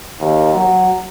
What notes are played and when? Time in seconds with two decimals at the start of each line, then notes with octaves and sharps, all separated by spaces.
0.20 D#2
0.54 F#3